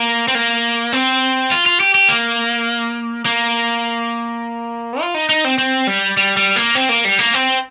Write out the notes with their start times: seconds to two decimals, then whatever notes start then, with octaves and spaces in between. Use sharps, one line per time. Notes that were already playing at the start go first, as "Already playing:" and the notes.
Already playing: A#3
0.28 C4
0.35 A#3
0.93 C4
1.52 F4
1.66 F4
1.80 G4
1.95 G4
2.09 A#3
3.25 A#3
5.01 F4
5.14 D#4
5.29 D#4
5.45 C4
5.58 C4
5.87 G3
6.17 G3
6.37 G3
6.56 A#3
6.75 C4
6.89 A#3
7.05 G3
7.19 A#3
7.34 C4